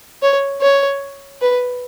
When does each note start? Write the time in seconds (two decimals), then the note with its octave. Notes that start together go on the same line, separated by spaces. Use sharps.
0.23 C#5
0.61 C#5
1.42 B4